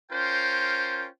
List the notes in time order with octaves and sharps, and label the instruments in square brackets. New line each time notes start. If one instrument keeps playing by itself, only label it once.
[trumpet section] C#4 F4 A#4 C5 G5